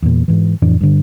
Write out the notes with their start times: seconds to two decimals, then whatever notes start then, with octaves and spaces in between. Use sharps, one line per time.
0.02 E2 A#2
0.28 G#2 E3
0.62 F2 A2 E3 D4
0.81 G2 D3